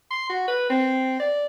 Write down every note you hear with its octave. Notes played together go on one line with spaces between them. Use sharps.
C6
F#4
B4
C4
D5